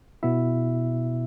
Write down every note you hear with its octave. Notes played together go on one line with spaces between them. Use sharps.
B2 B3 E4 E5